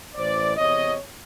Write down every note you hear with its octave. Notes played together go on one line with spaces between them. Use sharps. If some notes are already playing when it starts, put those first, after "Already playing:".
A1 A2 E3 C5 D5
E2 C3 C#5 D#5